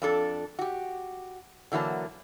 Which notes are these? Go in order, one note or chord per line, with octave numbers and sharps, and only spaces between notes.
F2 D4 A4
F#4 G4
D3 E3 F#3 A#3 A5